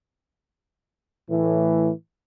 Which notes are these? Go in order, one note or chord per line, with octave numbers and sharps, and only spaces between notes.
A2 E3